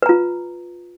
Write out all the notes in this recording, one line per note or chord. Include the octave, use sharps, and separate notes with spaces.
F4 B4 A#5